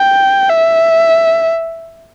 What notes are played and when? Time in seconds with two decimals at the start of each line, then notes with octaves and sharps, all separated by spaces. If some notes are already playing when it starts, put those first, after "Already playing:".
Already playing: G5
0.50 E5